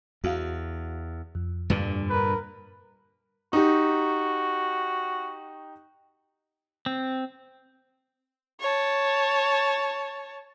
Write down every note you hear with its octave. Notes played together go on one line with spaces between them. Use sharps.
E2 F#4 F5
F2
G2 A#2 D3
A#4 B4
D#4 F#4 G4
C4
C#5 A5